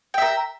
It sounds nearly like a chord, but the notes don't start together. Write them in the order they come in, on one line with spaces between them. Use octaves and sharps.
G5 E5 A#4